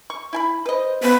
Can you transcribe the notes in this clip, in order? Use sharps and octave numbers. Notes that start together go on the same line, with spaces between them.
C#6
E4 G#5 B5
B4 C5 D#5
C#3 A3 B3 B4